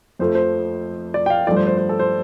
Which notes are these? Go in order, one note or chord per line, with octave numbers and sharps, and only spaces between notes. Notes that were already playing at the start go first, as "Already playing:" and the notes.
F2 F3 A3 C5
C5
D5
G5
F5
G2 F3 A3 D5
C5
C5
C5
A4
C5